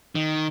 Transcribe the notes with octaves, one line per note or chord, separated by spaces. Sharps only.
D#3